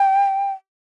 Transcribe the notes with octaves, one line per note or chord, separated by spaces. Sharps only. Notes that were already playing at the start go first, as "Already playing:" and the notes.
Already playing: G5